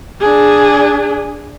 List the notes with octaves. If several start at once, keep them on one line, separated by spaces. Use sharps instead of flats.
D4 G#4